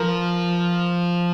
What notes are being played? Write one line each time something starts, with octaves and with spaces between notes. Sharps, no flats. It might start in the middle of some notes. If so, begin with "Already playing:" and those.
Already playing: F3 A#4